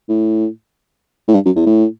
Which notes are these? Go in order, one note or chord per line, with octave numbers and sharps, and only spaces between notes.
A2
A2
G2
F#2
E2
A2